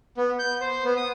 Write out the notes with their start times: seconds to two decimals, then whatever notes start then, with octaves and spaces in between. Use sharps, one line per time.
0.17 B3
0.39 G6
0.61 C5
0.85 B3
0.97 D#6